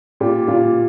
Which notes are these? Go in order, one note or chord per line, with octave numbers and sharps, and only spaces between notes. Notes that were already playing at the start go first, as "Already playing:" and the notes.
A#2 G4
A#2 F4